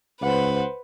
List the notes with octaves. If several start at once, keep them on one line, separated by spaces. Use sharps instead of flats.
C#2 B4 C5 F#5